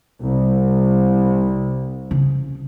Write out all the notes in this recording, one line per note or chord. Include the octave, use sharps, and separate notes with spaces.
C2
C#3